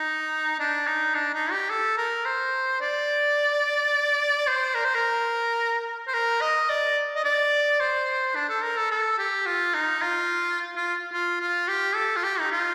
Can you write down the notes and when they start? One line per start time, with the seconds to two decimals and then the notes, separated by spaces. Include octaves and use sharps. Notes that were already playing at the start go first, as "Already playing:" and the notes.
Already playing: D#4
0.60 D4
0.87 D#4
1.15 D4
1.34 D#4
1.52 G4
1.70 A4
1.98 A#4
2.26 C5
2.81 D5
4.47 C5
4.75 A#4
4.85 C5
4.95 A#4
6.07 C5
6.14 A#4
6.41 D#5
6.69 D5
7.16 D#5
7.24 D5
7.80 C5
8.35 D4
8.49 A4
8.63 A#4
8.77 A4
8.91 A4
9.18 G4
9.46 F4
9.74 D#4
10.02 F4
10.76 F4
11.13 F4
11.40 F4
11.68 G4
11.95 A4
12.16 F4
12.23 G4
12.39 D#4
12.52 F4